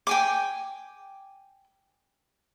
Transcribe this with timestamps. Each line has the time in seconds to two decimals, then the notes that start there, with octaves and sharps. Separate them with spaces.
0.07 G5 G#5 D6